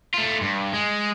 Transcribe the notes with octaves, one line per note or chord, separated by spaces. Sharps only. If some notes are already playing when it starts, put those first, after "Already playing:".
A3 F4
G2
G#3